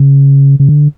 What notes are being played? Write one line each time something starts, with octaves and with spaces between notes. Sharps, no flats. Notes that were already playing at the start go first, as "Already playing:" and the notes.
Already playing: C#3
C#3
D3